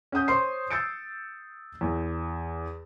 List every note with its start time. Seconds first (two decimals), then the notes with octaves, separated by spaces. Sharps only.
0.12 C#4 F#5 D#6 G6
0.28 C5 C#5 C6 C7
0.71 E6 G6 A6 C#7 D7
1.81 E2